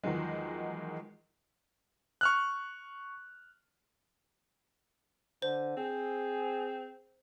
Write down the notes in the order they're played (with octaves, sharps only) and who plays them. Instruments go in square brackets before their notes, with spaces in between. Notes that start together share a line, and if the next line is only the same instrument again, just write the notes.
[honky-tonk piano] E2 D#3 F3 F#3 G#3
[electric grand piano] C#6 F6 F#6
[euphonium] D3 [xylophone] C5
[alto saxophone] C4 [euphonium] G#4